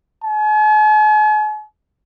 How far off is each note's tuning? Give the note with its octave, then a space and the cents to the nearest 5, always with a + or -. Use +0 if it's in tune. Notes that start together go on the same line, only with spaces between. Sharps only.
G#5 +45